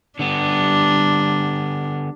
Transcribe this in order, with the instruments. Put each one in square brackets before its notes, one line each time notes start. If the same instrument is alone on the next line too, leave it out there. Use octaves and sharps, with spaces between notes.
[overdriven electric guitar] D3 B3 [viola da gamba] G3 D4